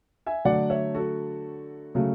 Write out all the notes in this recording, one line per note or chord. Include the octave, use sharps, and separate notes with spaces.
E5 G#5
D3 F#3 A3 D5 F#5
C#5 E5
F#4 A4
C#3 F#3 A3